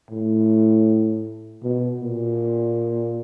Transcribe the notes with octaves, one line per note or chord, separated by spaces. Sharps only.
A2
B2
A#2